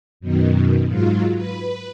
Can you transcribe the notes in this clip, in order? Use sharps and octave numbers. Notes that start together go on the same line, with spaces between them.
F#2 B2 D#3
G#2 F#3 F4
B4